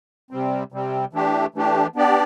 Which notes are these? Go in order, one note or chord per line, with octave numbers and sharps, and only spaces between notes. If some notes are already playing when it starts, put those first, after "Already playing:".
C3 G3 C4
C3 G3 C4
E3 A3 D4 G4
E3 A3 D4 G4
B3 D4 G4 D5